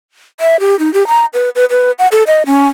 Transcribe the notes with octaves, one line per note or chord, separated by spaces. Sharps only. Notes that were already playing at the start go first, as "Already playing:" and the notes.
E5
G4
D#4
G4
A#5
B4
B4
B4
F#5
A4
D#5
C#4